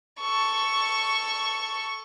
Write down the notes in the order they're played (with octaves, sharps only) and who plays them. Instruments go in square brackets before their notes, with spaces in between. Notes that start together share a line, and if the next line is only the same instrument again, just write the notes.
[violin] A4 C#6